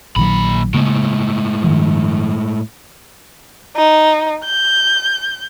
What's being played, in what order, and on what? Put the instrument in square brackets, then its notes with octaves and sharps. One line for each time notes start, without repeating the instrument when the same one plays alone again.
[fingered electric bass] A#1 D#3 F#3 [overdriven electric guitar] A#2 B5
[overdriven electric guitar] A2 G#3 [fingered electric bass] C#3 A#3
[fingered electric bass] G2 D#3 F3
[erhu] D#4
G6